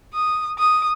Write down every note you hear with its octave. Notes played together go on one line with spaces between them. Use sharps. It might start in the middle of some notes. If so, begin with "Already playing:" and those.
D#6
D#6